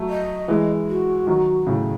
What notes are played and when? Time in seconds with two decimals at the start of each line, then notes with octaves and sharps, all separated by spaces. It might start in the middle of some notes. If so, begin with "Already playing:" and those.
Already playing: F#3 A3
0.09 D#5
0.48 E3 G#3
0.88 F#4
1.27 D#3 F#3
1.67 A2 C#3